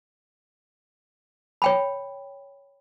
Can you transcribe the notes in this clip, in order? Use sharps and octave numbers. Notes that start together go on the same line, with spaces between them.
C#5 G5 B5